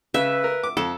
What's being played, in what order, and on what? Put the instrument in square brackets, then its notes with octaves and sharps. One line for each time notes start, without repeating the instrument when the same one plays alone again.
[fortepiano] C#3 [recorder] B4 [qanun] E5
[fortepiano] A#4
D6
[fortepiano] F2 [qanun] A4